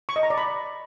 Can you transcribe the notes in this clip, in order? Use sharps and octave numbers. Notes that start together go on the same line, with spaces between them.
C#6
D#5
A#5
D5
B5